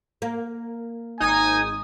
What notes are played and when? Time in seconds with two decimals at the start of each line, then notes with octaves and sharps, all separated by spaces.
0.22 A#3
1.20 G#1 D#4 G#5 D#6